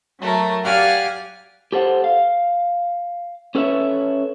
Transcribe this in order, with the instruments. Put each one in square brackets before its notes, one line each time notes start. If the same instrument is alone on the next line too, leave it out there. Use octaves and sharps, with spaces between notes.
[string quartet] F#3 A3 A#4
G4 D5 F5 F#5 G#5 F6
[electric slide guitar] G4 A4 C5 F#5
F5
C#4 A4 B4 C#5 E5